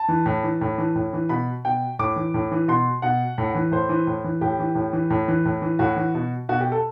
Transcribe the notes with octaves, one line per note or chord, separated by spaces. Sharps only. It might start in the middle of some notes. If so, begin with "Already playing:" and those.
Already playing: A5
E3
A2
E3
A2
E3
A2
E3
B2 B5
B2 G5
A2 D6
E3
A2
E3
B2 C6
B2 F#5
A2
E3
A2 C5
E3
A2
E3
A2 G4
E3
A2
E3
A2
E3
A2
E3
A2 F#4
E3
B2
B2 F#4
G4
A4